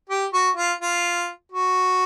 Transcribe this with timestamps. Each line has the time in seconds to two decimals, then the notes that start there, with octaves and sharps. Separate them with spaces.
0.09 G4
0.33 F#4
0.56 F4
0.81 F4
1.52 F#4